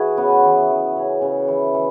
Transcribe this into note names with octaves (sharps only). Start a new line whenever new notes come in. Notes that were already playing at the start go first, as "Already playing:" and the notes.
Already playing: E3 F#4 G#4 C#5
C#3 B3
E3
E3
C#3
C#3
E3
E3